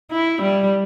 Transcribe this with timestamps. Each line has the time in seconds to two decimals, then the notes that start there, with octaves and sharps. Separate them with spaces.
0.12 E4
0.42 G3